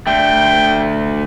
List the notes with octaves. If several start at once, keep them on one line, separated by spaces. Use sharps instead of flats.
D3 A3 G5